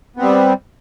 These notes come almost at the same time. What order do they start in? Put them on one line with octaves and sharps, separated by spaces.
B3 C4 G3